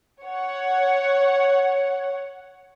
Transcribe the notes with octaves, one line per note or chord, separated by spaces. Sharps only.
C#5 F#5